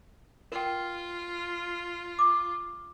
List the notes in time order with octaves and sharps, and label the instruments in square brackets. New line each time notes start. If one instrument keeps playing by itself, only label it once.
[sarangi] F4 [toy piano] A#4 G5
[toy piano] D6